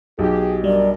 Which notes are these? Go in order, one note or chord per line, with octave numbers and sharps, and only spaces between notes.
B1 G4 G#4
G2 G3 A#4 D5